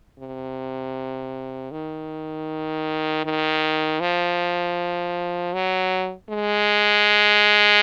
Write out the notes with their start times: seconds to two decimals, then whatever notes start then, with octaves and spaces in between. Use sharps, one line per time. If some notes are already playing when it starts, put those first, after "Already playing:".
0.19 C3
1.71 D#3
3.25 D#3
4.00 F3
5.54 F#3
6.29 G#3